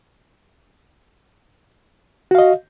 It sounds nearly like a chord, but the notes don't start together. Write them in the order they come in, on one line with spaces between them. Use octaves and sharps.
F#4 F5 D#5